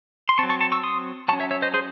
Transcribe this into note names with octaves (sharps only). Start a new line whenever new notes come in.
C6
C4 A5 C#6
F#3
A5 C#6
A5 C#6
C#6 E6
C6 D#6
F#3 C#4 A5 C#6
C#5 E5
C#5 E5
C5 D#5
G#4 C5